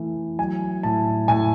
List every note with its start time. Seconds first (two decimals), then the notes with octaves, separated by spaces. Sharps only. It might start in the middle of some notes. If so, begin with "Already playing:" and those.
Already playing: E3 A3
0.38 F#3 G#5
0.83 A2 A5
1.28 A2 G#5